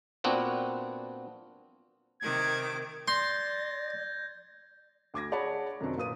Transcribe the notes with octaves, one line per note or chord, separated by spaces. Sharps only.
A#2 B3 C4 D4 F#4
C3 D#3 D6 G#6
D5 C6 G6 G#6 A#6
D2 D6 G#6 A#6
G#4 C#5 D5 F#5 A5 B5
F#2 C3 D#3 F#3 C4 D4
A#2 F4 B4 D#6 D#7